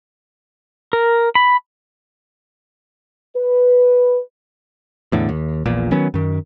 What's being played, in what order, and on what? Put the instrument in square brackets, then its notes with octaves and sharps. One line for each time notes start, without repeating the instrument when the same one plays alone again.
[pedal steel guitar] A#4
B5
[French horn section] B4
[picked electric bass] E2 A2 D3
D#2
A#1 E2 A#2
D#3 F#3 B3 C#4
F#2 D#3